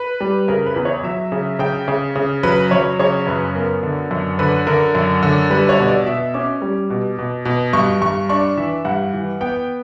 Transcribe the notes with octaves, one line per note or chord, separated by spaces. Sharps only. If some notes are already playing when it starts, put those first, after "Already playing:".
Already playing: B4
G3
C#3 A#4
B4
E2
C#5
F#3 E5
C#3
C#3 G5
C#3
C#3
F#3 B4
F#3 C#5
C#3 C#5
F#2 B4
B3 A#4
D3
F#2
D3 B4
D3 A#4
F#2
D3
G3 B4
C#5
B2
D5
B2 E5
C#4 D6
G3
B2
B2
B2
G2 C#6
G2 C#6
D4 C#6
E3 E5
G2 F#5
E3
B3 G5